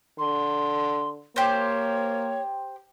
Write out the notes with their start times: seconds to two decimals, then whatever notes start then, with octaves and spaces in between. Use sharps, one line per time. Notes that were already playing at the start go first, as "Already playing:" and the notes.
0.19 D3 C6
1.36 A#3 G4 C5 C#5